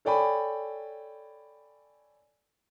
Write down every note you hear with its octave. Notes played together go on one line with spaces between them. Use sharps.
A4 C#5 D5 G5 G#5 B5